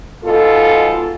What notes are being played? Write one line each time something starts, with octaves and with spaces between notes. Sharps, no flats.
G#2 B2 F4 A4